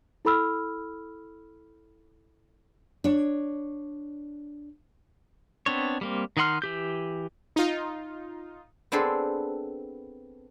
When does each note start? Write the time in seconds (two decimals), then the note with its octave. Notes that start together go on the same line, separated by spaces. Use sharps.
0.25 E4 A4 B5 E6 F6
3.04 D4 C#5
5.66 B3 C4 D4 C#5
6.01 G3 A#3 C4
6.37 D#3 D#4 F#5 C6 F6
6.62 E3 G4 G6
7.56 D#4 F4
8.92 B3 C4 D4 G#4 A4 C5